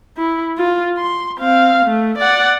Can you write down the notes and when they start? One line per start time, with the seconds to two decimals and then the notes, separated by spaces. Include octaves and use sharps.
0.17 E4
0.58 F4
0.98 C6
1.39 C4 F5
1.85 A3
2.18 D5 F#5